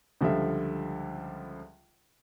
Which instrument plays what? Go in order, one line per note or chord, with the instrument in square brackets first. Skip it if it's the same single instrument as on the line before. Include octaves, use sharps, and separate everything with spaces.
[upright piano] C#2 D3 F3 G3 E5